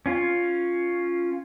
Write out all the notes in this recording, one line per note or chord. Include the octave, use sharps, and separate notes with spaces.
C#4 F4